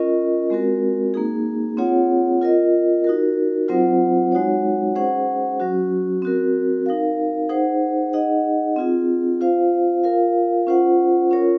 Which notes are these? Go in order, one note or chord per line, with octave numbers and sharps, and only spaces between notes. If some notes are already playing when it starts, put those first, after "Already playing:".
Already playing: C#4 F4 A#4 D#5
G#3 C4 F#4 A#4
A#3 D#4 G#4
C4 F4 G#4 C#5 F#5
F4 A#4 D#5
D#4 F#4 A#4
F#3 C4 F4 C5 F#5
G#3 D#4 F#4 C#5 F#5
C#4 G#4 C5 F#5
F#3 C#4 F#4
C4 F#4 A#4
D#4 A#4 F5
D#4 G#4 C5 F#5
D#4 G#4 D#5 F#5
C4 F4 G#4
F4 C5 F5
F4 A#4 F5
C#4 F4 C5 F#5
C#4 F4 A#4 C#5